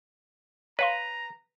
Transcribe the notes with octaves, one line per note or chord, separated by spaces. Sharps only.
B4 C#5 F5 A#5 C6